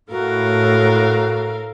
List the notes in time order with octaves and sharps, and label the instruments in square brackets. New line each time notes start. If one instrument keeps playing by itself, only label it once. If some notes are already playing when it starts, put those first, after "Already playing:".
[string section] A2 [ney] F#4 [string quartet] A4 A#4 F5